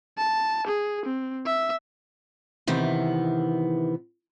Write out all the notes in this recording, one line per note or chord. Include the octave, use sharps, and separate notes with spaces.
A5
G#4
C4
E5
C3 D#3 E3 B3